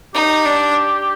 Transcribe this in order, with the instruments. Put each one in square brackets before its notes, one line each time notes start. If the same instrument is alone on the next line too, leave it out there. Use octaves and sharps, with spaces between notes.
[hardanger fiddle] D#4 [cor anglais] G4
[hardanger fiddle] D4